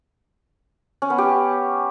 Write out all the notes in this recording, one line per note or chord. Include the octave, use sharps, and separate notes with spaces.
C#4
B3
G4